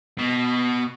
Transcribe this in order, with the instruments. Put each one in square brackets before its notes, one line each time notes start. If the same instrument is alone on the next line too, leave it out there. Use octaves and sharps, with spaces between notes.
[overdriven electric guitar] B2